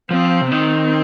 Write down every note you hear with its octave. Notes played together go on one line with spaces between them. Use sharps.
F3 C4
C3
D#3 C4